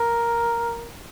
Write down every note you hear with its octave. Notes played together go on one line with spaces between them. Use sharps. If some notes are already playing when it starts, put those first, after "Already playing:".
Already playing: A#4